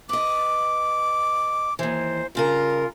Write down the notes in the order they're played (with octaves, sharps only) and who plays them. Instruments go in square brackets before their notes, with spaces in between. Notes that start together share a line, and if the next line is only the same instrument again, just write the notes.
[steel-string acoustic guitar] B4 D#5 [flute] D6
[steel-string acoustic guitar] D#2 E3 [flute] C5
[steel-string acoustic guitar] G2 C#3 A#4 [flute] F4